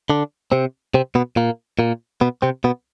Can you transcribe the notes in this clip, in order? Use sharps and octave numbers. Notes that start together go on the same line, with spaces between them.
D3 D4
C3 C4
C3 C4
B2 B3
A#2 A#3
A#2 A#3
B2 B3
C3 C4
B2 B3